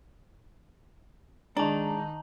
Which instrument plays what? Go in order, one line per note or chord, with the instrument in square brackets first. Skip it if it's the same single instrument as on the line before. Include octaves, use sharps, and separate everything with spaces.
[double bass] D#3 D#4 [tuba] G#3 [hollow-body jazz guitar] D4 [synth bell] A5 A#5